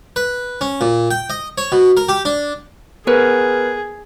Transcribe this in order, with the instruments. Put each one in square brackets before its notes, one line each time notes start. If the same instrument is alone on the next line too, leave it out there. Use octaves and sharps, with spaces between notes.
[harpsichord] B4
C#4
A#2
G5
D#5
C#5
B2
A#4
G4
D4
[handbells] B3 A#4 B4 [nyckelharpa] G#4